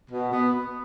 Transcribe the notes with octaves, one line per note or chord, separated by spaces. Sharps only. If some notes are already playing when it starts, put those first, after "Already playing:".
B2
B3